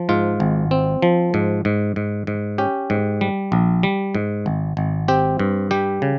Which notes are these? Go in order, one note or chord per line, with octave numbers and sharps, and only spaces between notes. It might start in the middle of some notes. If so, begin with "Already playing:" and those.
Already playing: F3
G#2 F4
G#1
C4
F3
G#2
G#2
G#2
G#2
C#4 G4
G#2
G3
A#1
G3
G#2
G#1
G#1
C4 G4
G2
G3 G4
C#3